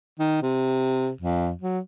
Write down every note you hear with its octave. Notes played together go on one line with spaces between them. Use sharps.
D#3
C3
F2
F#3